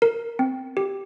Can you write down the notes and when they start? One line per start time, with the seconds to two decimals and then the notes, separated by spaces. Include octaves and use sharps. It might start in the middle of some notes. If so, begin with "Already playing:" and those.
0.02 A#4
0.39 C4
0.77 G4